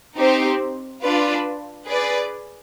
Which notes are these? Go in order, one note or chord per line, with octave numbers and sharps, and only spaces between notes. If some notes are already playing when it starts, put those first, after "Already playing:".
C4 D#4 G4 C5
D4 F4 B4 D5
G#4 B4 D5